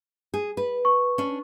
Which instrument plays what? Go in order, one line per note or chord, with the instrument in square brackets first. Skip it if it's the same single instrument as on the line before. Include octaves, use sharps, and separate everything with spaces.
[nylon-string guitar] G#4
B4
[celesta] C#6
[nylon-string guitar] C#4 D4